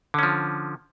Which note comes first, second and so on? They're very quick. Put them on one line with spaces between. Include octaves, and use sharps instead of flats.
D3 C#4 F3